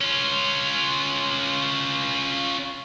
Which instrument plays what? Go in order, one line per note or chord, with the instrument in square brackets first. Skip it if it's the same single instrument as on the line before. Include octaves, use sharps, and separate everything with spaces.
[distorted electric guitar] C#4 F4